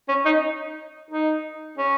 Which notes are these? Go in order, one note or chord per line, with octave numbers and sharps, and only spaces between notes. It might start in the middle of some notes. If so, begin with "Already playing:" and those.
C#4
D#4
D#4
C#4